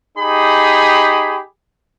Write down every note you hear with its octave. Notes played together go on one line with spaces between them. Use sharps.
D#4 G4 G#4 B5